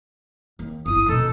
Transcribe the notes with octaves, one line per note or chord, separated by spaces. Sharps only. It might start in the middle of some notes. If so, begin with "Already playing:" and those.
D#2
G1 E4 D#6
D#1 B2 D#4 A4